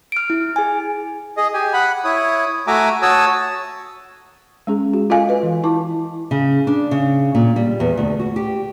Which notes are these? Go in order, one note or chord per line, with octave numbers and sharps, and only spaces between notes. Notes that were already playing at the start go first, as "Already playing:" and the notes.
F6 D7
E4
G#4 G#5
G#4 D#5
G4 G#5
F#5 B5
E4 C#5 D#6
A3 F#4 E5 G#5 A#5 D6
F#4 C#5 A5 D#6 E6
G#3 C#4 G#4
F#4
F4 A4 D#5 F5 G#5
B4 D#5
E3
E4 A5 D6
C#3
D4
C#3
A#2
G3
E2
D2
F#4
G4